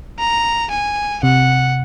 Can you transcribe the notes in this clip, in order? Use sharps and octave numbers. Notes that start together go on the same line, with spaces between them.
A#5
G#5
C3 F#5